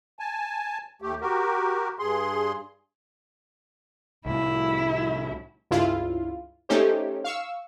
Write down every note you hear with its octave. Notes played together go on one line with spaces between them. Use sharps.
G#5 A5
D#2 A3 G4
F#4 G4 A#4
G2 G#4 C6
C2 A2 E4
C#2 G2 E4 F4
A3 C#4 D#4 G4 C5
F5 C#6 E6